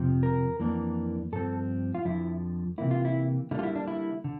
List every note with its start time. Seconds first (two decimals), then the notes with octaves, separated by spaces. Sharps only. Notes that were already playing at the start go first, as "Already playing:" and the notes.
Already playing: F2 C3 F3
0.23 A#4
0.60 F2 E3 A#3 D4
1.32 G2 F3 C4 A4
1.95 F4
2.05 F2 D3 F3 E4
2.78 C3 E3 A#3 E4
2.91 F4
3.05 E4
3.51 D3 G3 A#3 D4 E4
3.59 F4
3.63 E4
3.76 D4
3.88 E4
4.24 D3